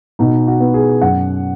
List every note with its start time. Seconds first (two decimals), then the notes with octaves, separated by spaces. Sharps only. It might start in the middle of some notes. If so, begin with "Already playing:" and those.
0.19 B2 D#4
0.47 F#4
0.60 B3
0.74 G#4
1.01 F#2 F#5